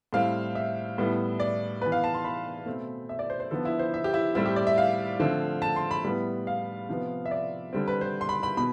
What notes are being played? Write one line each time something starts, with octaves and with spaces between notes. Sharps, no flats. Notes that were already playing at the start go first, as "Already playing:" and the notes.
A2 G3 C4 F5
E5
A2 G3 B3
D5
E3 B3 B4
F5
A5
C6
B5
B2 A3 C4
E5
D5
C5
C5
D3 F3 B3 A4
E4
C5
E5
G4
E4
A2 G3 C4 E4
G4
D5
E5
F5
D3 F3 A3 C4
A5
C6
B5
A2 G3 B3 B5
F5
C3 F3 B3
E5
D5
D3 G3 C4
B4
C5
C6
B5
B5
B2 B5